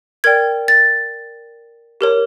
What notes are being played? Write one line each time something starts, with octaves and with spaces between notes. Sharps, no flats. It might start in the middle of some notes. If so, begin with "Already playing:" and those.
A#4 D5 G5 G#6
A6
G4 A#4 C#5